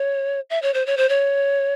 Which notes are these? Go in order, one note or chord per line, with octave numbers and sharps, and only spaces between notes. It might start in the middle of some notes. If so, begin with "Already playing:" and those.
Already playing: C#5
E5
C#5
C5
C#5
C5
C#5